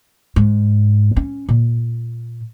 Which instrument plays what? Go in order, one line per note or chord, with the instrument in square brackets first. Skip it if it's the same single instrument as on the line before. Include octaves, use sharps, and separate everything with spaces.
[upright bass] G#2
C#4
A#2